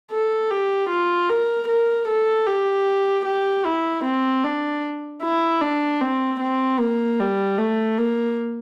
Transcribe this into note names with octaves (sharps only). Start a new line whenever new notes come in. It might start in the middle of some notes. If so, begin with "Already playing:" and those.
A4
G4
F4
A#4
A#4
A4
G4
G4
E4
C4
D4
E4
D4
C4
C4
A#3
G3
A3
A#3